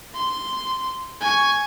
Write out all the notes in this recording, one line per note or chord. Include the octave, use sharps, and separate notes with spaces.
C6
G#5 C#6